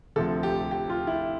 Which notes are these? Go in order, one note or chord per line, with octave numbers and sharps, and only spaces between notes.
D2 C3 F3 A4
G4
G4
F4
E4